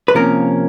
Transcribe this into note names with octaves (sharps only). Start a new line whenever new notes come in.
B4
C3 F3 A#3 C#4 A#4